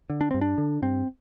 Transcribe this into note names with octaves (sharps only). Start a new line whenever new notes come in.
D3
D4
G2 C4
D4
D3
G2 C4